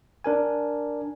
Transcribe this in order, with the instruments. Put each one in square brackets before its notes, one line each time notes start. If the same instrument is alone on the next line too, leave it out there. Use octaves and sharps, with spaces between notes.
[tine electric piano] D4 A#4 G#5